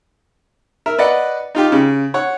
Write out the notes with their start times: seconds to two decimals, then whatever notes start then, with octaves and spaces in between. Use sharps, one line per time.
0.86 A#4 E5
0.98 B4 D5 D#5 F#5
1.55 D#4 F4 G4
1.72 C#3
2.14 C#5 F#5